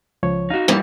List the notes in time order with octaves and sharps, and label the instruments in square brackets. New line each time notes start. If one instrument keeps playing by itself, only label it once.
[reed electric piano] C#2 F3 C#5
[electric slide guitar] D#4 F#4 [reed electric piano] F5
[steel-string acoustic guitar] D#2 G#2 E3 [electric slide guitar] G3 [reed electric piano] A#3